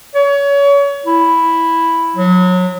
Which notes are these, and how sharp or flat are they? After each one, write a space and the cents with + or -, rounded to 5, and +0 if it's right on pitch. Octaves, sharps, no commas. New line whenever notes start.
C#5 +30
E4 +0
F#3 -25